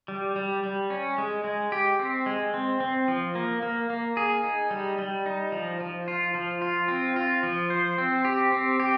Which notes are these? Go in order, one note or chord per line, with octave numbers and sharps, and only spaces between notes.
G3
G3
G3
C#4
G#3
G#3
G4
C4
G#3
C4
C4
F3
A#3
A#3
A#3
G#4
D#4
G3
G3
D#4
F3
F3
F4
F3
F4
C4
F4
F3
C5
C4
G4
C4
G4